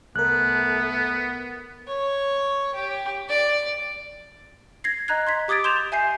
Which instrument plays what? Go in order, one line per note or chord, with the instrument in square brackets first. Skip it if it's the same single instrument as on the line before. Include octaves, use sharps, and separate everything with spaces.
[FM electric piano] C2 A#4 [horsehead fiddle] A3 A4 [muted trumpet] B3 [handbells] F#6
[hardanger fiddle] C#5
G4
D5
[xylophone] G#6 A#6 C7
D#5 A#5 F#6 G#6
C6 G#6 B6
G4 D6 D#6 G#6 A6 D7
C6 G6 E7 F7
E5 G#5 G6 C7